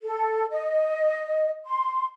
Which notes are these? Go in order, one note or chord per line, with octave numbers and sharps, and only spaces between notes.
A4
D#5
C6